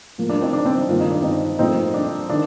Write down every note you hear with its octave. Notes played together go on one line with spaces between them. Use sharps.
A2 F3 A#3
D4
C4 D#4
D4
C4
D4
G2 D#3 A#3 F4
D#4
D4
C4 D#4
A#2 F3 A3 C4 D#4
D4
D#3 D4